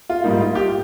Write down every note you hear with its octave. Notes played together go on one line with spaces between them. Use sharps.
F4
G#2 G3 A#3 D#4
F4
G4